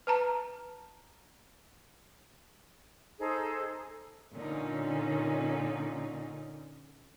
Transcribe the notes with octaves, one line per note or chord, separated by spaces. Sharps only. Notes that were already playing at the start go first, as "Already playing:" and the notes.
B4 A5 A#5
D#4 G#4 A4 C5
A#2 D3 C#4 D#4